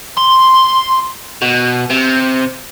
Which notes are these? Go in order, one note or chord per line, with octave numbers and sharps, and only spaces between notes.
C6
B2
C3